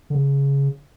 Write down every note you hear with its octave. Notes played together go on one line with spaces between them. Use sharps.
D3
C#3